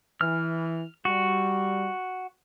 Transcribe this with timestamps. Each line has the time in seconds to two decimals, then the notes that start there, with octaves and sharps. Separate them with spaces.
0.21 E3 F6
1.05 G3 F#4